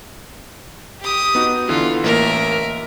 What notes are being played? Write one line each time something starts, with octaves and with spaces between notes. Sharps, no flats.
G4 D#6
B3 D#4 F#4
D3 E3 B3 F4
A1 A#3 A#4 E5